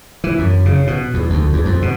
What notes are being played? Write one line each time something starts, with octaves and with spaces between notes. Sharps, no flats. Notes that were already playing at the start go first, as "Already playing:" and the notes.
E3
F#2
C#3
B2
E2
D2
E2
F2
B2